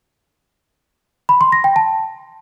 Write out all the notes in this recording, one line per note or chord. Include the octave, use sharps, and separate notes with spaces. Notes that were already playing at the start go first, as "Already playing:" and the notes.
B5
C6
A#6
G5
A5